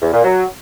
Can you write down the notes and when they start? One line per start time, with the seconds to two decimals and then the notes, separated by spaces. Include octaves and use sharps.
0.02 E2
0.13 A#2
0.25 F#3